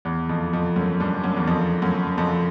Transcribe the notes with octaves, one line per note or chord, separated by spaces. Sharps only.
E2
F2
F2
F#2
G2
F#2
E2
F2
F#2
F2